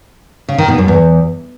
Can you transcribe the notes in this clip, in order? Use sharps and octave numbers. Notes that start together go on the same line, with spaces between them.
C#3
D#3
B2
F#2
E2